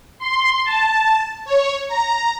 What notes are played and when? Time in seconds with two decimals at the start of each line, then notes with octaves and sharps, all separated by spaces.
0.19 C6
0.64 A5
1.45 C#5
1.88 A#5